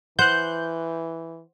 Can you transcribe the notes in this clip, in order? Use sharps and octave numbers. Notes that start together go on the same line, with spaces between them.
E3 C5 F#5 F#6 G6